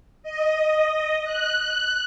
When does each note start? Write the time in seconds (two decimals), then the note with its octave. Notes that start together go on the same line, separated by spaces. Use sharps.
0.23 D#5
1.24 F#6